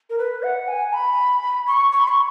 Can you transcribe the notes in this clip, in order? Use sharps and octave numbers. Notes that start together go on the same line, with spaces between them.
A#4
B4
F#5
G#5
B5
C#6
C#6
B5
C#6